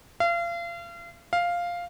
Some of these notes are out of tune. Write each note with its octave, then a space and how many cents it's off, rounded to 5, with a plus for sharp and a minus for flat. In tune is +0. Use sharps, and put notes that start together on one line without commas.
F5 -35
F5 +0